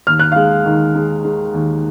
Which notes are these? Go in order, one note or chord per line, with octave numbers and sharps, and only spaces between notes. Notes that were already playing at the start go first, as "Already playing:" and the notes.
D#2 F6
F#6
G#3 F5 F6
D#3
G#3
G#3
D#2